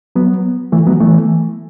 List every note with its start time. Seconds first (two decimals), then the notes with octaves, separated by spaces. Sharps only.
0.16 F#3 B3
0.72 E3 A3
0.86 F#3 B3
1.00 E3 A3